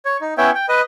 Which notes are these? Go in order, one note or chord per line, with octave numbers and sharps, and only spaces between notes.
C#5
D#4
B3 C#4 E4 C#5 E5 G5
G5
B4 D#5